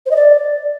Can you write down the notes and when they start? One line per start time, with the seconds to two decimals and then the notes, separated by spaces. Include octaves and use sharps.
0.06 C5
0.11 D#5
0.16 D5